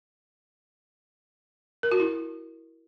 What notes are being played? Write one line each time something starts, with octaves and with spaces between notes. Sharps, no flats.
A#4
F#4
E4